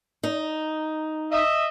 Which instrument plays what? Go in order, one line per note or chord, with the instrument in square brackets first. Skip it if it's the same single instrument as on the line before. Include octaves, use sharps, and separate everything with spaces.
[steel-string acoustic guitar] D#4
[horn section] D#5 E5